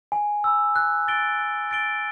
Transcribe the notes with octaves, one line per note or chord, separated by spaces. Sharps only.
G#5
B5 E6
F#6
A6 D7 G7
F#6
A6 D7 G7